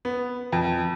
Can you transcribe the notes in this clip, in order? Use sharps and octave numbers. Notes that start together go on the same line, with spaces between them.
B3
F2